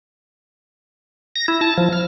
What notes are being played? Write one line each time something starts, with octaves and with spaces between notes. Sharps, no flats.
A#6
E4
A5
F3
F6